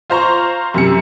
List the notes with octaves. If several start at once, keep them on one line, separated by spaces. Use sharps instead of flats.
F4 C5 A#5 C#6
F#2 C3 C#7